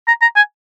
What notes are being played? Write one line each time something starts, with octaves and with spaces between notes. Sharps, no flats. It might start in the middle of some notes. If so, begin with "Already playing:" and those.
A#5
A#5
G#5